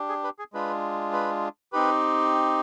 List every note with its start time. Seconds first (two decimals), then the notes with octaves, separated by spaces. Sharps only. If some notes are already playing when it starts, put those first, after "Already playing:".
Already playing: D4 G4
0.09 G#4
0.24 B4
0.39 G#4
0.53 G#3 D4 F4 B4
1.13 B4
1.73 C4 D#4 G4 B4